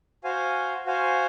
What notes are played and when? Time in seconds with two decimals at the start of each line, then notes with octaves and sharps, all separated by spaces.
0.24 F#4 C5 F5 G#5
0.86 F#4 C5 F5 G#5